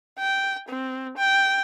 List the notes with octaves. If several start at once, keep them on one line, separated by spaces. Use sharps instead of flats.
G5
C4
G5